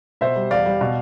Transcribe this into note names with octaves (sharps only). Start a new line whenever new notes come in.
B2 C5 E5
G3
E2 D5 F5
G3
B2